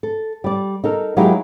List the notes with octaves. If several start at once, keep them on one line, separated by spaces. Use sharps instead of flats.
A4
G3 D5
D#4 A4 A#4
F#3 G#3 A#3 D#4 E4 G4